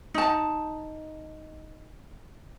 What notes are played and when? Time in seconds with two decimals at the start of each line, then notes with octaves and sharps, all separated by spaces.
0.14 D#4 A5